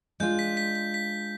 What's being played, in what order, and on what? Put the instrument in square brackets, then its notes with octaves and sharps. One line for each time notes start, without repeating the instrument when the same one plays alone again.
[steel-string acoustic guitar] G#3 D4 F4 [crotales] G6
[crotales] B6
B6
B6
B6